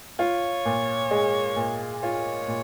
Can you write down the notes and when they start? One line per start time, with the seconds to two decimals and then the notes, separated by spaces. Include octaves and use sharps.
0.19 F4 C#5
0.65 A#2
1.11 G#3
1.56 A#2
2.03 F4 C#5
2.48 A#2